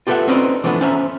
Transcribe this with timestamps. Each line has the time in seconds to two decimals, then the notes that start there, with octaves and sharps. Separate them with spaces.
0.07 F4 G4 A4 B4 E5 F#5
0.28 C4 C#4 D#4 B4 C5 D5
0.64 E3 F3 A3 B3 D4
0.81 C#4 C5 E5 G#5 A#5